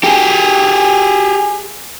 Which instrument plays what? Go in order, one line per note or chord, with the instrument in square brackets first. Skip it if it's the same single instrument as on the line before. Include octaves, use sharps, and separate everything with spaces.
[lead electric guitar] G4 G#4